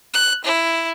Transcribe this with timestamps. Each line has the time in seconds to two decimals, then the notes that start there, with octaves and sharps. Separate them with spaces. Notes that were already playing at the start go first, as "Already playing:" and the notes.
0.14 F#6
0.44 E4